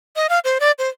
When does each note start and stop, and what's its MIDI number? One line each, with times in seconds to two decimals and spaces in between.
0.16 0.27 75
0.29 0.39 77
0.44 0.58 72
0.60 0.72 74
0.79 0.89 72